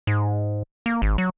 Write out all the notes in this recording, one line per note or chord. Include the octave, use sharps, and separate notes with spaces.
G#2
A#3
G#1
F#3